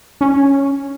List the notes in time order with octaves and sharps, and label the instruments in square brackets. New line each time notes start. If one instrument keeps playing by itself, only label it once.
[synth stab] C#4